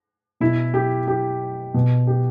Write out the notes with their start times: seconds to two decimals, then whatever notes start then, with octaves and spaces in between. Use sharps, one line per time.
0.40 B2 E4
0.74 G4
1.07 G4
1.74 B2
2.07 G4